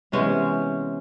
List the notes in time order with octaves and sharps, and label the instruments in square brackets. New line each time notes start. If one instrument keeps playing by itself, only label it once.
[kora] C3 E3 G#3 B3 C#4